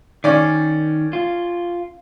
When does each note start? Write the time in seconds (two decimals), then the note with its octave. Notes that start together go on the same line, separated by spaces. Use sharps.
0.24 D#3 C#4 D5
1.13 F4